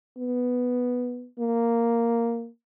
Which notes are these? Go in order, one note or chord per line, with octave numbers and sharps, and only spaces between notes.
B3
A#3